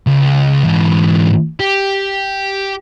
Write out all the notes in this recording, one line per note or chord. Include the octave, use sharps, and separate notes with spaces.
C#2
G#2 E3
G4